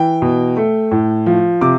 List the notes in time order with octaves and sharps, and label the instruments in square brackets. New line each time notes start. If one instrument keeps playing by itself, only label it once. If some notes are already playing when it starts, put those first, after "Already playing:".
Already playing: [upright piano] E3 G5
B2
A3
A2
F3
C3 D6